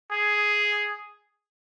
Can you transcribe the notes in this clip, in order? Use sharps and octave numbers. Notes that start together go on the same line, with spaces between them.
G#4